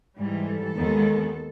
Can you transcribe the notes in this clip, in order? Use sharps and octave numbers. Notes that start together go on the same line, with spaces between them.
G#2 E3 G3
A4
D#2 D#3 G#3 B3